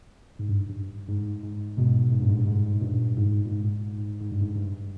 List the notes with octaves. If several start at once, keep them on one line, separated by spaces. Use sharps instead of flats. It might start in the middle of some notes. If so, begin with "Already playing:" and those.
G#2
G2
G2
G#2
G#2
G#2 B2
G#2
G2 A#2
G#2
G2
G#2
G2 A#2
G#2
A#2
G#2
G#2
G2
G#2
G2